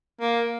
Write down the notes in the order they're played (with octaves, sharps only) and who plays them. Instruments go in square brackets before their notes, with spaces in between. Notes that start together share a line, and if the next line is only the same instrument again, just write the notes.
[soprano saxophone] A#3